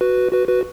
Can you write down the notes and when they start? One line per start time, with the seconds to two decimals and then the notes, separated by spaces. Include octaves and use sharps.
0.01 F#4 B4
0.32 F#4 B4
0.48 F#4 B4